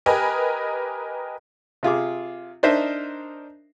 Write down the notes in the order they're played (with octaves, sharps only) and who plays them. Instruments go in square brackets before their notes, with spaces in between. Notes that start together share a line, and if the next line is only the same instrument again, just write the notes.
[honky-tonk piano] G4 A#4 B4 D#5 G#5
[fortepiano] C3 F4 G#4 D6
D4 D#4 A#4 C5 D#5 E5